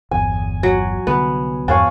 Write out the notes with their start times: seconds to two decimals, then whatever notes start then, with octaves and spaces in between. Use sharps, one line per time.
0.11 G1 E2 G#5
0.63 F#3
1.07 C2 D3 G3 B3
1.68 E2 G2 D4 C#5 F5 G#5